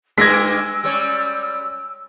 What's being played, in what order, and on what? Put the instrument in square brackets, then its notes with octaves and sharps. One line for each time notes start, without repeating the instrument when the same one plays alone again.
[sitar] G2 A#3 D#4 [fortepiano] G#3 [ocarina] E6 [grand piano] G#6 A#6 B6
[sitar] G3 C#4 C#5